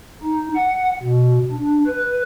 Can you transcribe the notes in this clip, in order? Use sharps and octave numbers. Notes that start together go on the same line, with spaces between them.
D#4
F#5
B2
D4
B4